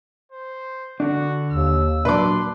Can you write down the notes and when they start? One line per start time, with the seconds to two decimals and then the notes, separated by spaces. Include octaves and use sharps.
0.32 C5
1.00 D3 D4 F#4
1.51 D#2 E6
2.05 A#2 F#3 D4 B4 C6 D6